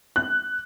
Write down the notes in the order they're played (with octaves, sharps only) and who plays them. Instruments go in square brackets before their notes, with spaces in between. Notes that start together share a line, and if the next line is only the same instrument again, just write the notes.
[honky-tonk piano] F#6